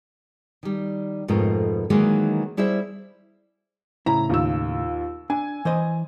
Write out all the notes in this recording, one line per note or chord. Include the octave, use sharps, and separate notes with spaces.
D#3 G3
F2 G#2 B2 A3 F4 A#4
D#3 E3 F#3 G#3 A#3 D#4
G3 E4 G#4 C5 E5
A2 C#3 E4 A#5
D#2 F4 E6
D4 G#5
E3 C5 D#5